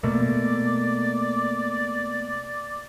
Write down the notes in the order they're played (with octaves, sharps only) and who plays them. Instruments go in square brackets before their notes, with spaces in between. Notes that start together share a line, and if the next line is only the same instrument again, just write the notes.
[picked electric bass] B2 A3 A#3 [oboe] D5